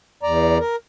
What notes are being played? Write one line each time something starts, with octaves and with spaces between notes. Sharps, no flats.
E2 D5 A#5
A#4